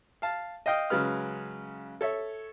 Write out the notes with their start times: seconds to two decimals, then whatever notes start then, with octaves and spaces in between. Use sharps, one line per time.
0.22 F5 A5
0.66 D#5 F5 G5 D#6
0.90 C#3 F#3 G#3 B4 F6
2.01 A4 C#5 E5